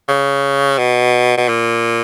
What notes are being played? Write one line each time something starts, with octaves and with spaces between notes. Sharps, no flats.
C#3
B2
B2
A#2